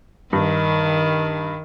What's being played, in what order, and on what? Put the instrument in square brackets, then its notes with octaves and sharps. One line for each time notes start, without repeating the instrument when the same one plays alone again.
[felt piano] G2 [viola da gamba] D#3